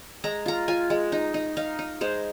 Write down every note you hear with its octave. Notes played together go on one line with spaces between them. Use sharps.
G#3 A#5
F4 A#5
F4 G#5
G#3
D#4
D#4
D#4 F5
D#4
G#3 C5